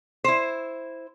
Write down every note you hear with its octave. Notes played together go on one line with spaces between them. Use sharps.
E4 C5